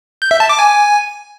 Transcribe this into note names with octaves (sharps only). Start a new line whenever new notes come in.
G6
E5
A5
D6
G#5